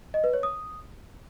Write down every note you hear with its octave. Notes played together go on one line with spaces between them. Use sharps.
D#5
B4
C#5
D#6